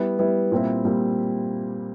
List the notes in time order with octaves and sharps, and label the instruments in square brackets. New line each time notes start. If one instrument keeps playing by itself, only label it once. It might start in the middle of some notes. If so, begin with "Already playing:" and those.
Already playing: [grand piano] G3 B3 E4
G3 B3 E4
A#2 G3 C4 E4
A#2 G3